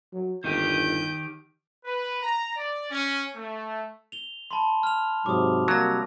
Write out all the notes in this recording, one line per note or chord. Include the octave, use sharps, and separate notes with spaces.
F#3
G1 D#3 D#4 G4 G6
B4
A#5
D5
C#4
A3
F7 G7
A5 B5 C6
F6 F7
G#2 C3 F#3 D6 D#6
C3 F#3 G3 A#3 E6 A#6